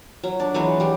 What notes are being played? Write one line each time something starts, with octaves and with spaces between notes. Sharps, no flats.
F#3
D4
E3 F#3 G#3 B3
G3 G4